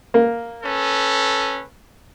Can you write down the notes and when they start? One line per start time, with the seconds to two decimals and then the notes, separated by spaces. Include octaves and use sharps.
0.14 A#3
0.63 C#4 A4 B4